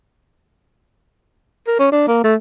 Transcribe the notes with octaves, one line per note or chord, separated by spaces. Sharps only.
A#4
C#4
D4
A#3
A3